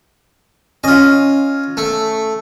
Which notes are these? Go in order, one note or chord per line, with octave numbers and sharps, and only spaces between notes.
C#4 F4 D#5
A3